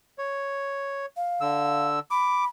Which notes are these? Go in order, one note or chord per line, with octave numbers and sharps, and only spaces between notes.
C#5
F5
D3 E6
B5 D6